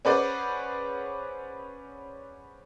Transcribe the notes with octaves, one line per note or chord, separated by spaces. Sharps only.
C#4 G#4 B4 C5 D5 F#5